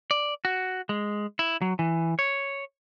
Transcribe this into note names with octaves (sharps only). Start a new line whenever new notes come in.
D5
F#4
G#3
E4
F#3
E3
C#5